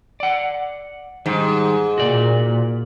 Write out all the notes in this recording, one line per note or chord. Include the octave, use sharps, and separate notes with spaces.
D5 F#5
G#2 D#3 G3
A#2 F#4 D5